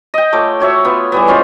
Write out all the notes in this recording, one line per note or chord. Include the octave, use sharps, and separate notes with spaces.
D#5 G5
A3 F4 C#5 D6
F#4 C#5 E5
B3 F4
E3 G3 B3
G#3 C#4 F4 C5